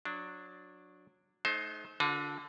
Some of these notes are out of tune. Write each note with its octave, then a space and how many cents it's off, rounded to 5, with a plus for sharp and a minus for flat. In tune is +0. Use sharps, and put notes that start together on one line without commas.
F#3 -20 D4 +0
A3 -45 D#4 +0 C5 +15
D3 -15 F4 +40 A#4 +15